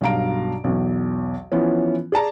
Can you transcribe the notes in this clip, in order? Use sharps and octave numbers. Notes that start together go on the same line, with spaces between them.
B1 G2 B2 F5 A#5 D7
B1 E2
E3 F3 B3 C#4
G#4 D5 A5 A#5